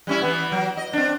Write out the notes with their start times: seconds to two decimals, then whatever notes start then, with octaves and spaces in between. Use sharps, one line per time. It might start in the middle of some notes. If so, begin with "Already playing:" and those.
0.07 G3 C#4 E4
0.22 E3 B3
0.52 F#3
0.77 D#5
0.93 C4 D4